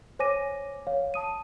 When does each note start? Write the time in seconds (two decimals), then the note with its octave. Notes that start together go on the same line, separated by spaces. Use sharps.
0.19 C5 C#5 G#5 D6 A#6 D#7
0.87 C#5 F5
1.14 A5 D#6 D#7